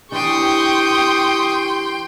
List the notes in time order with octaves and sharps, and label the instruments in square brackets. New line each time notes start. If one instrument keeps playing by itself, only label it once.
[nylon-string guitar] E3 D4 [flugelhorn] G4 [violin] G5 C6 [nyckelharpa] C#6 D#6